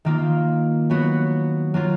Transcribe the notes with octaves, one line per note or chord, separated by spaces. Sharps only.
D#3 A#3 F4
F#3 B3 F#4
F#3 A#3 F4